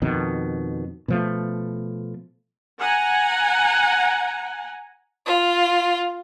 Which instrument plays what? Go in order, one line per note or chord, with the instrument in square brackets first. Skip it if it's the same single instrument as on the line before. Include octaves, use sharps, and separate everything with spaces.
[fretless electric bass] F2 B2 D#3
B2 F3 A3
[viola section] F#5 G#5 A#5
[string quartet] F4